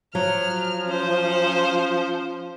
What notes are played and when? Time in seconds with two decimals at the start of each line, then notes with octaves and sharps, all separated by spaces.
0.15 F3 F#3 F6
0.88 C#4 C5